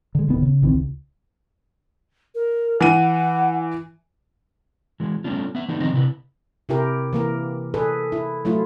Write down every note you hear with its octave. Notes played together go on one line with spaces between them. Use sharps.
D3 G#3
D1 D3 D#3 B3
C#3
A#1 D#3 E3 C4
C#2
A#4
E3 F#5 D#7
E3 G#3
G3 A3 B3 C#4 D4 F4
B3 E5
E3 A3 B3 D4 D#4
D#3 F3 C4 D#4 C5 D#5
C3 E4 B4
C3 E4 G4 A#4
E3 A#3 A#4
G#4 A4 B4
E4
F#3 A3 E4 F4